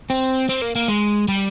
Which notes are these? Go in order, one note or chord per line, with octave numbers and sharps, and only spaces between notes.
C4
C4
A#3
A#3
G#3
G3